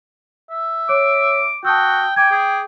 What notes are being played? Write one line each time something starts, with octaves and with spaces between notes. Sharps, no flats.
E5
C#5 D6
F#4 G5 A5 D#6 E6
G5 G#5 D6 G#6
G#4